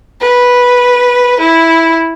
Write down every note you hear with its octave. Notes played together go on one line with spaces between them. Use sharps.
B4
E4